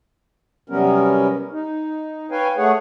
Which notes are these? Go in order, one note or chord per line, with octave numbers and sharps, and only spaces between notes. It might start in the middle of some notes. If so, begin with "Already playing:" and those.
C3 F#3 G3 B3 C#4 A#4
D#4
B4 C#5 F5 G5 G#5
A3 G#4 C#5 F#5